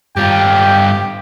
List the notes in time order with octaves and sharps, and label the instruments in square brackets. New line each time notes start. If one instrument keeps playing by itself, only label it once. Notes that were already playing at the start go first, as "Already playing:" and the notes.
[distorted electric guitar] G2 F4 [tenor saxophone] G4 [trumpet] G5